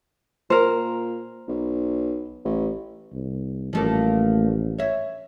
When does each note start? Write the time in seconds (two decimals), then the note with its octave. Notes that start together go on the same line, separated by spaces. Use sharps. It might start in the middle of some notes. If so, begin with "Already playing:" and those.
0.50 A#2 A#4 C5
1.48 B1
2.45 A1
3.13 C2
3.73 A1 F3 A3 A#3
4.78 C#5 E5